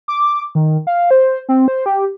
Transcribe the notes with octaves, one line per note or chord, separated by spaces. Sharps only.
D6
D#3
F5
C5
C4
C5
G4